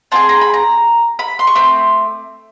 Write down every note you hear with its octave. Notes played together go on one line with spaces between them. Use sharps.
C4 F4 G#4 A5
A#5
B5
A#5
B5
C6
C#6
A3 C4 D6